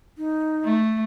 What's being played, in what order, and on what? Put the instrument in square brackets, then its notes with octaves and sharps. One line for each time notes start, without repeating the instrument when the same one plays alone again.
[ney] D#4
[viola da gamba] A3